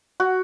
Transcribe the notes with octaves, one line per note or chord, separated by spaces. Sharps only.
F#4